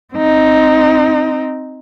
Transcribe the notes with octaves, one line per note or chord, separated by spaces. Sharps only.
C4 D#4